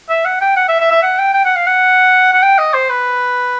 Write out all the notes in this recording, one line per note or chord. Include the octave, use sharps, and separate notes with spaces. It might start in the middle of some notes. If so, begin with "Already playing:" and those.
E5
F#5
G5
F#5
E5
E5
E5
F#5
G5
G5
F#5
F5
F#5
F#5
G5
D#5
C5
B4